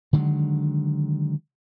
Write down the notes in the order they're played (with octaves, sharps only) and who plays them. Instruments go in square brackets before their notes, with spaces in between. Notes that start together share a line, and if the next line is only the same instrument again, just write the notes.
[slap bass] D3 D#3 F#3 G#3